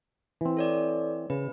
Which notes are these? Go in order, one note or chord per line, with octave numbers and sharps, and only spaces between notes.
E3 C4
A4 C#5 D5
C#3 B4